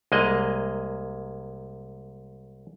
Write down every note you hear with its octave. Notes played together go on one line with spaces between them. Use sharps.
C2 G#3 A#3 D#5